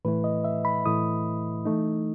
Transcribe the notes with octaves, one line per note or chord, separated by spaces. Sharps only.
A2 E3 A3 E4 B4
D#5
E5
B5
A2 E3 A3 E4 D#6
E3 A3 D#4